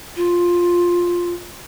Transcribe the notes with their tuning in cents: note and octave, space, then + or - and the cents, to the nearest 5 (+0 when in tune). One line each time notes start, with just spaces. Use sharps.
F4 +5